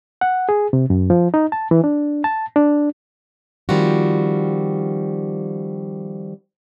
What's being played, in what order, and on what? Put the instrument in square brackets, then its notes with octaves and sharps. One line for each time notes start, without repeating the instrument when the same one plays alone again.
[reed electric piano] F#5
G#4
C3
F#2
F3
D#4
A5
E3
D4
A5
D4
[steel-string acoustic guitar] D#3 F3 G3 C4 F4 F#4